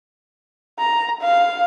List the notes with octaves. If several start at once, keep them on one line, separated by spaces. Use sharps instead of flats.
A#5
F5